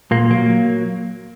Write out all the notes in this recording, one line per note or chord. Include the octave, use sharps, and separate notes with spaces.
A#2 A#3
F#3 A#3
F#3